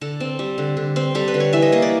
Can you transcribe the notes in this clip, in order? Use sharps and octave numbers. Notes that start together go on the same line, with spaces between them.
D3 A4
C4
G3
D3
D3
C4
G3 A4
B4
D3
C#5
E3 E5
D#5
A#3 D#5
D5